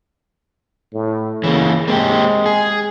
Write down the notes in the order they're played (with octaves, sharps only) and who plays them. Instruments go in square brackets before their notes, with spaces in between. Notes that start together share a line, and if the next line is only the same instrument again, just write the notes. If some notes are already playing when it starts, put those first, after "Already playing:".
[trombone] A2
[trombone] C#3 [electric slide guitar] E3 A#3
[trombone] G#3 [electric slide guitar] A#3 C4 G4
[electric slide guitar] G#4